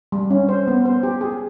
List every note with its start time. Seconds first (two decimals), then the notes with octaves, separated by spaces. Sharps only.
0.12 G3
0.30 C#4
0.49 C5
0.67 B3
0.85 C5
1.03 G4
1.21 G#4